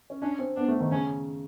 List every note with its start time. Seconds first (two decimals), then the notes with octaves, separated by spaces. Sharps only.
0.10 C#4
0.22 C#4 D4
0.39 C4
0.56 B3 D4
0.68 A3
0.80 D#3
0.91 C#3 C#4